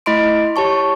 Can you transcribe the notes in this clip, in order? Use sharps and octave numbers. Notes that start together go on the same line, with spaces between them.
A3 E4 D#5 B5 C6 D7
G4 C#5 A5 C#6